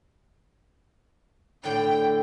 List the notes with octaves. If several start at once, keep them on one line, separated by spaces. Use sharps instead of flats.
A2 D3 D5 G5